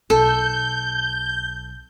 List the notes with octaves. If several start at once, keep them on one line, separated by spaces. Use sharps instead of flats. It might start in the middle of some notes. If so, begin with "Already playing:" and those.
B1 A4 G6